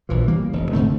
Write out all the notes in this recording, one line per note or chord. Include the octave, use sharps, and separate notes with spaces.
A#1 E3 F3
E3 G3 A#3
F1 C#3
G#2 D3 A3 C4